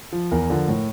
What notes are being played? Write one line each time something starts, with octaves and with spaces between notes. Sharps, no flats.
F3
E2 A#4
D3 F3
A2